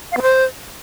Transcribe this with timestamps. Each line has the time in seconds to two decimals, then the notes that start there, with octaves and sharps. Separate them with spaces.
0.12 F5
0.17 B3
0.22 C5